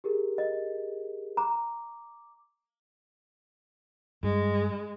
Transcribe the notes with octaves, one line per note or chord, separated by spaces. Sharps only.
G4 G#4 A#4
D#5
A#5 D6
G2 G#3